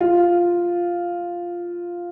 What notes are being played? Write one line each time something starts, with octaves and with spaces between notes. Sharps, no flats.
F4